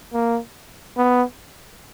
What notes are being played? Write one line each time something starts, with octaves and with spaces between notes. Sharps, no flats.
A#3
B3